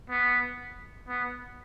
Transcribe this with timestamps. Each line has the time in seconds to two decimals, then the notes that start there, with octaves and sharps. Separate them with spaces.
0.10 B3
1.08 B3